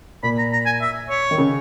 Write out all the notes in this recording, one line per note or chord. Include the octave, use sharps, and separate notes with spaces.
A#2 B5
A#5
A#5
G#5
E5
C#5
D#3
C#3